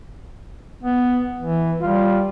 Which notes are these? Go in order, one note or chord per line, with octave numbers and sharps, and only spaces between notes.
B3
E3
G3 F4